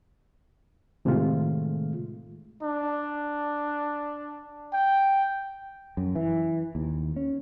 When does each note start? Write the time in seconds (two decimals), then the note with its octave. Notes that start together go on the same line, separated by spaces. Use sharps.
1.05 A2 C3 D#3 G#3 A3 F4
2.63 D4
4.73 G5
5.97 F#2
6.15 E3
6.75 D#2
7.16 C#4